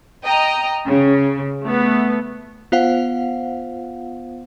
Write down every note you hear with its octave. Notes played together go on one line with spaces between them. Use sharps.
D#5 G5 A#5
C#3
A3 B3
B3 F4 C5 F5 F#5